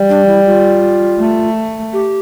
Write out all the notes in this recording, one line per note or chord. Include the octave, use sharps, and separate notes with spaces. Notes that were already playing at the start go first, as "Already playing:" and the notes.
Already playing: G3
D4
E4
F4
A3
G4